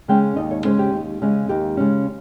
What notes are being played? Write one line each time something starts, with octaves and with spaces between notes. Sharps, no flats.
C#3 G#3 C#4 G5
D#2 D#5
C#5
C#3 G#3 C#4 C5
G4
D#2
C#3 G#3 C#4
D#2 G4
C#3 G#3 C#4